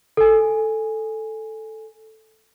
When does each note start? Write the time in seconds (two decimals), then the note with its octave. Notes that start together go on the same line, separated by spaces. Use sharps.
0.17 A4 G#5